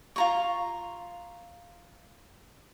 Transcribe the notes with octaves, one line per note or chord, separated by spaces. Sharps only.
F4 A#5 C#6